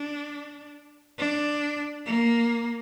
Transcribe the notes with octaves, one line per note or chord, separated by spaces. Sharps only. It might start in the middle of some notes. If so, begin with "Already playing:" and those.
Already playing: D4
D4
A#3